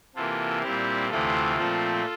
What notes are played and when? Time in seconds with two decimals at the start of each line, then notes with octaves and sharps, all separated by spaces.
0.15 C3 E3 A#3 F4 A4
0.63 A#2 G3 C4 E4 G4
1.10 D2 C3 E3 A3 C4 F4 A4
1.57 A#2 F3 A3 C4